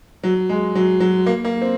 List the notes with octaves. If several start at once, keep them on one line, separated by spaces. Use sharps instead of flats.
F#3
G#3
F#3
F#3
A#3
A#3
C4